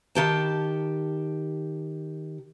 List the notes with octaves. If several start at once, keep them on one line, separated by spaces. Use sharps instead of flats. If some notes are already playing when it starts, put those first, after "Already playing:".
D#3 G4 A5